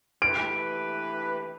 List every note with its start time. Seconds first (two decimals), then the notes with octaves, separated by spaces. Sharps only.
0.22 E3 A3 G4 B4 D7